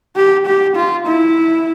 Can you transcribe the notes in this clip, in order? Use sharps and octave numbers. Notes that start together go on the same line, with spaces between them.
G4
G4
F4
E4